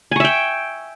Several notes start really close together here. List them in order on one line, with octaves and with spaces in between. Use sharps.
G#5 C#6 E5 G5